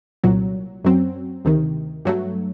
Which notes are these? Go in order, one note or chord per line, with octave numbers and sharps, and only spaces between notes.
C2 A#2 F#3
F#2 F#3 C4
D2 C3 D#3
G2 F#3 A3